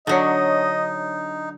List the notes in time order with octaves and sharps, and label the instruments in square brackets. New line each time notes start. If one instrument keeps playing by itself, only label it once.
[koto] D3 F#3 [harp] D4 C#5 [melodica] D#4 [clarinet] D#5